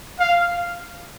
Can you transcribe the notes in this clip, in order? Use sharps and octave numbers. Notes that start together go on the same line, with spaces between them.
F5